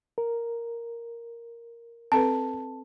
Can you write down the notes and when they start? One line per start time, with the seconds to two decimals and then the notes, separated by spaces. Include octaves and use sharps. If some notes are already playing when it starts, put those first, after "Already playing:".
0.18 A#4
2.12 C4 A4 B4 A5